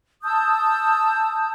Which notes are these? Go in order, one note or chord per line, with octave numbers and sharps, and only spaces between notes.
A5 D#6 E6 G6